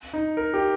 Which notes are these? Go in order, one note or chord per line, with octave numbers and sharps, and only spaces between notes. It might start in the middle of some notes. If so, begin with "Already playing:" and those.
D#4
A#4
G4